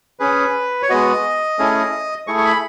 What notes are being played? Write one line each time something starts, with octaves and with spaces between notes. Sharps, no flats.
C#4 G#4 B4
C#5
G#3 B3 F#4 D#5
A3 C#4 E4 G#4
A3 E4 G#4 C#6
C#6
B5